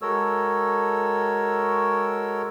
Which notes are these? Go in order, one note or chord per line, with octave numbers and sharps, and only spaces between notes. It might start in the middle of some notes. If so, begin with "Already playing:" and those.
G#3 F#4 A4 A#4 C#5 E6